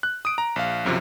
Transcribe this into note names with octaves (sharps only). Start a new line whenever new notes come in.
F#6
D#6 D7
A#5
A#1 F5
B1 F#2 C3 F3